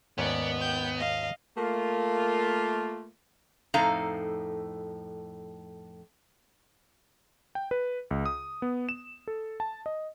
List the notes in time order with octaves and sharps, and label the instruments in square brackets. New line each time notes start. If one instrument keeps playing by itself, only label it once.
[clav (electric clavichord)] D#2 G#2 C#4 [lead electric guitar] B3 [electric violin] D5
[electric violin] G5 G6
D#5 F5
[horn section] A3 A#3 F4
[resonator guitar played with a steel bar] F2 A2 D#4 A4 F5 A#5
[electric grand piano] G5
B4
C#2
D#6
B3
E7
A4
A5
D#5